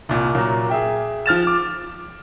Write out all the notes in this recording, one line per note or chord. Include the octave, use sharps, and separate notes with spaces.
C2 A#2
A#2 F#3 A#3
G#4 E5 G5
F3 F6 A6 E7
D6